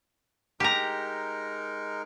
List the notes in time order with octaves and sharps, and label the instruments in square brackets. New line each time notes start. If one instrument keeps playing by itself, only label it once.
[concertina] G#3 D#4 A#4 [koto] G4 A#5